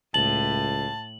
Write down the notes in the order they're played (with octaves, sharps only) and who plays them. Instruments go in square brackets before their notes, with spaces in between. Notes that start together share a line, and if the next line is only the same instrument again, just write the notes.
[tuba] C#2 [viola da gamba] A2 [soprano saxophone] A5 [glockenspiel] F#7